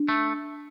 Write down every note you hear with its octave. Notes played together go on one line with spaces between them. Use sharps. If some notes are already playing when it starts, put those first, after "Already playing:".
Already playing: D4
A3